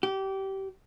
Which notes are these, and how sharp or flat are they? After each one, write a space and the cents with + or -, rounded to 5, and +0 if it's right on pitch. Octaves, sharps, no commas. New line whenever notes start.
G4 -25